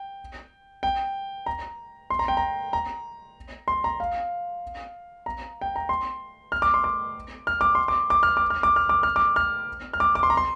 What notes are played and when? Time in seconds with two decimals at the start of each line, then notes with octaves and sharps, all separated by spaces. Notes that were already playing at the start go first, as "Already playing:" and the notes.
Already playing: G5
0.83 G5
1.46 A#5
2.10 C6
2.19 A#5
2.28 G5
2.37 A#5
2.73 A#5
3.68 C6
3.84 A#5
4.00 F5
5.26 A#5
5.61 G5
5.76 A#5
5.89 C6
6.52 F6
6.62 D6
6.74 C6
6.84 D6
7.47 F6
7.61 D6
7.75 C6
7.88 D6
8.10 D6
8.23 F6
8.37 D6
8.50 F6
8.63 D6
8.76 F6
8.89 D6
9.03 F6
9.16 D6
9.36 F6
9.93 F6
10.00 D6
10.15 D6
10.23 C6
10.30 A#5
10.37 C6